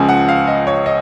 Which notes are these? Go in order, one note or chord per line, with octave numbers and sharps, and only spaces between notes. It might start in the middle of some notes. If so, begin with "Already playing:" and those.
Already playing: C#2 C#3 F3 G#5
F#5
F5
D#5
C#5
D#5